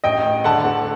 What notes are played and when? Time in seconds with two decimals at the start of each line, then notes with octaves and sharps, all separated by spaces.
0.04 A1 D#5 G5
0.25 A1
0.44 D3 F#5 A5
0.65 A3